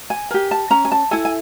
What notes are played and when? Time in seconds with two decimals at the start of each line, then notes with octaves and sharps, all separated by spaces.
0.10 G#5
0.31 G4 A#4 G#5
0.51 A5
0.70 C#4 A#5
0.85 G#5
0.92 A5
1.11 E4 A4 G#5
1.25 G#5